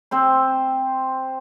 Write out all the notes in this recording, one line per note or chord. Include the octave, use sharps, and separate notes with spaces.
C4 C5 C6